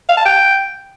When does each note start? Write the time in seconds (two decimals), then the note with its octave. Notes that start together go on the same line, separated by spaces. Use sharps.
0.09 F5
0.17 A5
0.25 G5